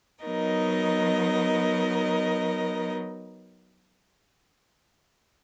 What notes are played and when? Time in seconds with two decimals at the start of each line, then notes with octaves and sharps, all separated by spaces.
0.24 F#3 B3 D#4 A#4 D#5